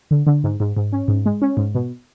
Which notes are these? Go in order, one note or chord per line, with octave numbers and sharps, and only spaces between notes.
D3
D3
G#2
G#2
G#2
C#4
G#2
G#3
C#4
G#2
B2